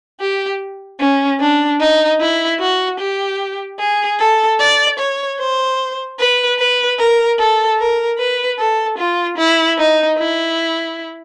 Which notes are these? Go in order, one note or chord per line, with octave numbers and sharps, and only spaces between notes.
G4
C#4
D4
D#4
E4
F#4
G4
G#4
A4
D5
C#5
C5
B4
B4
A#4
A4
A#4
B4
A4
F4
E4
D#4
E4